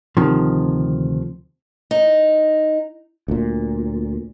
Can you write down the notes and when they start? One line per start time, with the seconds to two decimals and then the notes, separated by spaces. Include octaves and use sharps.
0.17 D2 C3 D#3 F3
1.91 D#4
3.28 D2 A#2